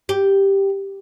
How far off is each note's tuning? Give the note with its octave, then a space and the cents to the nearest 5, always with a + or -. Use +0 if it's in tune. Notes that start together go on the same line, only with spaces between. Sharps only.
G4 +0